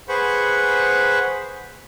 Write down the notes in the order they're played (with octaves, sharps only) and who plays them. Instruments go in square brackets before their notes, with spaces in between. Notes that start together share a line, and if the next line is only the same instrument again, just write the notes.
[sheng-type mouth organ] G#4 B4 C5 F#5 B5 C#6